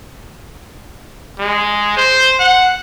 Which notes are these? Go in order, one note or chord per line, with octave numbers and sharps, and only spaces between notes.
G#3
C5
F#5